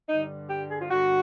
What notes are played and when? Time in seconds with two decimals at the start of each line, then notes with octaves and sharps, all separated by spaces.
0.09 G2 D3 G3 D#4
0.49 G4
0.71 G#4
0.81 F4
0.91 G2 D3 G3 F#4